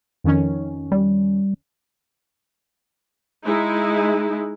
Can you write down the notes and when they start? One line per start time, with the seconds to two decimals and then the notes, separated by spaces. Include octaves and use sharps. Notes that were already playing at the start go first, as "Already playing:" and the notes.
0.24 F2 D#3 C#4
0.92 G3
3.45 G#3 D#4 E4